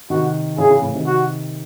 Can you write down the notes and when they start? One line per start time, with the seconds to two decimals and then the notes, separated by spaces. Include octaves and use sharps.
0.10 C3 D#3 F#4
0.58 C#3 E3 G#4
0.70 C#3 E3
0.82 A2 C#3
0.94 C3 D#3
1.06 F#4